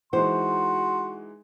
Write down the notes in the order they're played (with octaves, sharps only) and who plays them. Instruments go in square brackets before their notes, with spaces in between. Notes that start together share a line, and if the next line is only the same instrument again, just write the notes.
[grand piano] E3 G#3 D#4 [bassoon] F#4 [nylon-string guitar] C5 [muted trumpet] C6